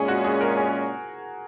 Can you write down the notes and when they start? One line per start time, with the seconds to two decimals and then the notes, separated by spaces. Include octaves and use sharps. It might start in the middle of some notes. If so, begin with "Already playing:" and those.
Already playing: A#2 G#3 C#4 G#4
0.08 F#4
0.24 G#4
0.41 A#4
0.57 G#4